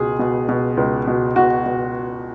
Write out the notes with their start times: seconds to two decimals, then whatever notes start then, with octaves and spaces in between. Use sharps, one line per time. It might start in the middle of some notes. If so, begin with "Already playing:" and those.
Already playing: C#2 B2 G#4
0.19 B2
0.49 B2
0.77 C#2
1.07 B2
1.36 B2 F#4
1.66 B2